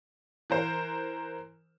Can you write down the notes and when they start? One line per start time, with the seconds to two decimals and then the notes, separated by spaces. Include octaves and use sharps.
0.50 E3 A#4 C5